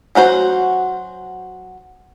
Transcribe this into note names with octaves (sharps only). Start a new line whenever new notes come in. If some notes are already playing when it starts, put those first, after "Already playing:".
F#3 C#4 F#4 C5